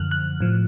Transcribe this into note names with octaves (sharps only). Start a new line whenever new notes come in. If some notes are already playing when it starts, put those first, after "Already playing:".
Already playing: F#2 D3 F3 F6 F#6
F#6
A2 F3